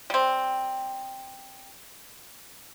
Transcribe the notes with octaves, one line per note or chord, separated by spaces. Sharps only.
G3 C4